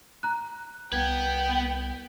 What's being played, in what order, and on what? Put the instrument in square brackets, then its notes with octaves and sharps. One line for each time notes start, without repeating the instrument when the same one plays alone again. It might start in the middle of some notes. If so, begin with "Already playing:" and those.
[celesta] A#5 F#6
[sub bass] C2 [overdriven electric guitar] B3 B4 [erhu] G5 [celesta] G#6